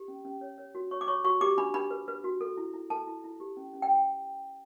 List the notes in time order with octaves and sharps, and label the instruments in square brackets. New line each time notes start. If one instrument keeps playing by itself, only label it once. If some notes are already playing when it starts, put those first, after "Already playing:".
Already playing: [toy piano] G4
C#4
C#4
C#5
C#5
F#4
C#5 C#6
D6
C#5 C#6
F#4 C#6
G4 D6
D4 B5
D4 B5
B4
B4
F#4
A4
E4
E4
A4 A5
E4
E4
G4
C#4
C#4
G5